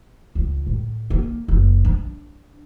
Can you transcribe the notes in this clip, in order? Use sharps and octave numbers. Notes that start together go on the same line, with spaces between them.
C#2
A2
A#3
F#1
D4